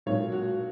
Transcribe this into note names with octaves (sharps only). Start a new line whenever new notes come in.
B1 A#2 F#3 C#5
F#4